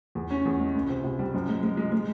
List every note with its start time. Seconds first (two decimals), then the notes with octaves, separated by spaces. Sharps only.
0.15 E2
0.30 C#4
0.45 E2
0.59 G#3
0.75 C#2
0.89 C3
1.04 C3
1.19 G3
1.34 F#2
1.49 G#3
1.63 G#3
1.77 G#3
1.92 G#3